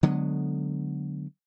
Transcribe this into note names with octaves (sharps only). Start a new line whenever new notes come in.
D3 F#3 G#3 B3